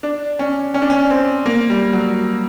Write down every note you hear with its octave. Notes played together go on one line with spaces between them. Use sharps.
D4
C#4
C#4
D4
C#4
C4
A#3
G3
F#3